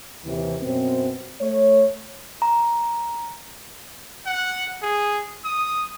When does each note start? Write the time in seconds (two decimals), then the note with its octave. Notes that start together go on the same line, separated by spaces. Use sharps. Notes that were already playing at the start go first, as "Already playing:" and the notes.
0.25 D#2 C3 E3
0.62 F#2 B2 F#3 C4
1.40 A3 C#5
2.42 A#5
4.26 F#5
4.82 G#4
5.44 D#6